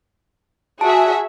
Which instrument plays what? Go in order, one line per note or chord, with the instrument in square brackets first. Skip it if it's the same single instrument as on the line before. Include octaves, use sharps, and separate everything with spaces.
[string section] F#4 G#4 E5 [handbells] A5